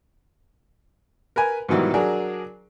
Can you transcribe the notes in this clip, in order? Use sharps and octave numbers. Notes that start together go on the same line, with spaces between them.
A#4 B4 G#5
G#2 B2 D#3 E3 F#3 G3
F#3 D4 G#4 A#4